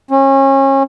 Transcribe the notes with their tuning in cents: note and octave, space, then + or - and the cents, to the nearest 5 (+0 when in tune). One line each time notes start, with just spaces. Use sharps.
C#4 -30